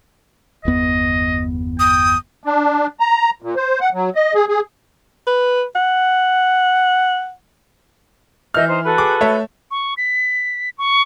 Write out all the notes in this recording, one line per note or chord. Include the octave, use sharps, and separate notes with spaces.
G1 E2 B3 D#5
G5 D#6
D4
A#5
A#2
C5
F#5
F#3
D#5
G#4
G#4
B4
F#5
E3 D#5 E5 F6 G6
D#4 C5
F#4 A4 B4
G#4 D6
A3 C#5 E5
C#6
B6
C#6